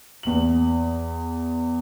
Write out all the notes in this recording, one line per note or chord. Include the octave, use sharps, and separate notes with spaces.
E2 F#7